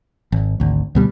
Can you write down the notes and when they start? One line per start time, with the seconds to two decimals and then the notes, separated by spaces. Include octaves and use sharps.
0.32 G#1
0.60 G#1 D2
0.95 D2 B2 G3